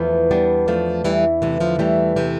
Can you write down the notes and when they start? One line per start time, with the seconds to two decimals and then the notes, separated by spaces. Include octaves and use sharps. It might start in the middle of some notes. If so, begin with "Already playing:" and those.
Already playing: E2 F3 A3
0.31 G3 B3 D4
0.68 F3 A3 D4
1.04 E3 G3 E4
1.42 C3 E3 A3
1.60 D3 F3
1.79 E3 G3 A3
2.16 C3 E3 G4